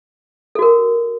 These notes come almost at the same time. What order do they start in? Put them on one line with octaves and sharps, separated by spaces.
A4 F#4 A#4